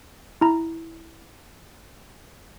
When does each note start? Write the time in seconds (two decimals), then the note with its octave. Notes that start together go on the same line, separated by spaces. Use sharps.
0.41 E4 A#5